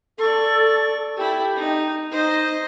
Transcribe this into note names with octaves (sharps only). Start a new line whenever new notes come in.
A4 D5 C#6
E4 G4 A4
D#4
D#4 C5 D#5